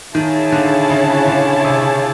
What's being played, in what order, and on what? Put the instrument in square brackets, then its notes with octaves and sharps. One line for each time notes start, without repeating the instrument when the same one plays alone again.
[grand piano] D#3 [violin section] E4 G#4 C#5 F5 A5
[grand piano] D3
C#3
D3
C3